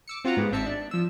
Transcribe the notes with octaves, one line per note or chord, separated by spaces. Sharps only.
D6 E6 C#7
C4 F4 F#4 F#5 A#5
G#2 G#3 B3 G4
G#1 C4 E5 A5 C#7
D4
F3 E6